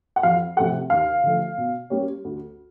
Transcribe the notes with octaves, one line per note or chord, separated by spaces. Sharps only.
F#5
F2 F5
C3 F3 A3 F#5
D#2 F5
D3 F3 A3
B2
G3 A#3 C#4
D2